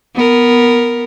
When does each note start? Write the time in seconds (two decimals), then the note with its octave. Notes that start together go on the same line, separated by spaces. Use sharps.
0.15 B3 A#4